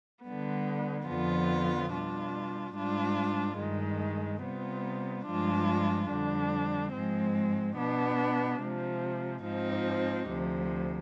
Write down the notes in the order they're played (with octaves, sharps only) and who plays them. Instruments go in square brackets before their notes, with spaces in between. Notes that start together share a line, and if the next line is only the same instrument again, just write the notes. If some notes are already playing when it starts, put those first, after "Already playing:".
[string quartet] D3 G3 B3
F2 D3 F3 B3 F4
B2 G3 D4 F4
G#2 G3 D4 F4
G2 D#3 G#3
C3 G3 B3 F4
G2 F3 G#3 D4 F4
F2 D3 G3 D4
G#2 F3 G#3 C4
B2 B3 D4
C3 F3 G#3
G#2 F3 C4 D#4
D2 C3 F3